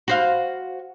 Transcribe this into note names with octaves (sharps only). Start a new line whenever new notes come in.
F#4 C5 F5